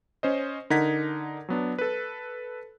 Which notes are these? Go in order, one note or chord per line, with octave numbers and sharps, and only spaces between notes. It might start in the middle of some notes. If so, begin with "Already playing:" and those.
C#4 C5 D#5
D3 D#4 A#4 F#5 G#6 B6
F#3 B3 D4
A4 B4